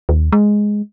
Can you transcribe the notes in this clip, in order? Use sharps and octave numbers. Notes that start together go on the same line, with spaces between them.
D#2
G#3